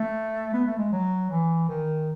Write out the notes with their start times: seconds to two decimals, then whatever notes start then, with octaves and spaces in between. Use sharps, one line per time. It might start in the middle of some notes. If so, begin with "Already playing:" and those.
Already playing: A3
0.53 B3
0.66 A3
0.79 G#3
0.92 F#3
1.31 E3
1.68 D#3